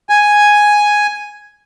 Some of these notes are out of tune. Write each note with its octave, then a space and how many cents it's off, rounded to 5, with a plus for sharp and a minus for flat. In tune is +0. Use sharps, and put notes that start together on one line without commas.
G#5 +0